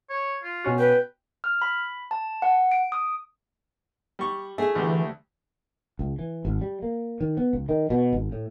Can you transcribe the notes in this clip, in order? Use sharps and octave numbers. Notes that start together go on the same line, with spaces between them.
C#5
F4
B2 C#4 F#4
B4 G5
F6
B5
A5
F#5
D7
D#6
G3 C#6
A3 E4 G#4
D2 E3 G3 A3
C#2
E3
G#1
G3
A#3
D#3
B3
C#2
D#3
B2
G#1
A2